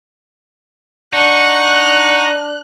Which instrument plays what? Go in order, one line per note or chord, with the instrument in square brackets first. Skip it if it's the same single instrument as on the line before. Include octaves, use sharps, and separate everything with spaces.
[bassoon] D4 [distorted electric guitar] D#4 [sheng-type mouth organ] F#5 C#6 [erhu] F#6